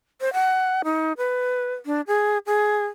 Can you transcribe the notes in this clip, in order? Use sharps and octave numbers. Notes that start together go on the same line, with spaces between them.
C5
F#5
D#4
B4
D4
G#4
G#4